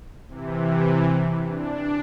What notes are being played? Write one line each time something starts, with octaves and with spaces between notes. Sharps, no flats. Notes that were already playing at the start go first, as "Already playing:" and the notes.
C3 E3
D4